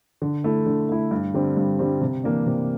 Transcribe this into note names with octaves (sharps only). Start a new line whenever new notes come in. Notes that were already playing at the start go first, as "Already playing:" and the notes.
D3
A3 E4
D3
A3 E4
G2
D3 G3 C4
G2
D3 G3 C4
C3
E3 A#3 D4
C3